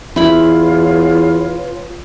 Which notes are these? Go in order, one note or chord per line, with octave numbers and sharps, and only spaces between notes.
E2 E4 F4 B4 C#5 B5